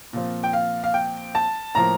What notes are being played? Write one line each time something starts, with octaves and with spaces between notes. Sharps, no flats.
A#2 F3 C4
G5
F5
F5
G5
A5
A2 F3 A#3 A#5